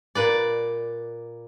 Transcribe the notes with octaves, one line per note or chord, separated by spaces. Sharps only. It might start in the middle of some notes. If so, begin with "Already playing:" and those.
A#2 B4 D5